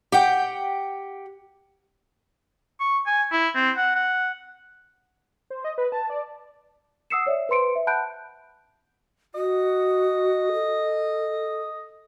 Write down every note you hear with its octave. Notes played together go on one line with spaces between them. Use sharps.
G4 F#5 G5
C#6
G#5
E4
C4
F#5
F#5
C5
D#5
B4
A5
D5
F#5 D#6 E6 C7 C#7 E7
C#5 D5 E5
B4 C5 C6 C#7 D7
E5
F#5 A5 B5 F#6 G6 D7
F#4 D#5
A4